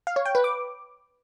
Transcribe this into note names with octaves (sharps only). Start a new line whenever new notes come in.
F5
C#5
G5
B4
D6